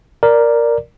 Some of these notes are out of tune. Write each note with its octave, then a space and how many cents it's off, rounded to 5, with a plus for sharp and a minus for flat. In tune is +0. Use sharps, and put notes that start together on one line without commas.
A#4 +0 D5 +0